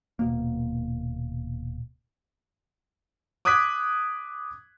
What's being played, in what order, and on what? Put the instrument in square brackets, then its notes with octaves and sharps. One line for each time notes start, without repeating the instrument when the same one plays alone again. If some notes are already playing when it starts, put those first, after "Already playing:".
[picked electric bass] D#1 B2 A#3
[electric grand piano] D6 D#6 F#6 G#6 B6